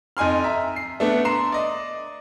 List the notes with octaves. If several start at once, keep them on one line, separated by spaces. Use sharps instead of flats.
F2 D#4 G#5 C6 F6
E5 A#5
C7
A3 B3 D4
A#5 C6 C7 E7
D5 D#5